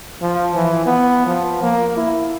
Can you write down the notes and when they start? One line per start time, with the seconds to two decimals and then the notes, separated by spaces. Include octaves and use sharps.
0.21 F3
0.55 E3
0.86 B3
1.26 F3
1.62 A#3
1.97 E4